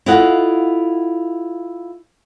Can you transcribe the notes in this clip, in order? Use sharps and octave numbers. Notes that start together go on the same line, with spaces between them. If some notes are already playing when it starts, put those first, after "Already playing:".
E4 F4 A4 D#5 F5 F#5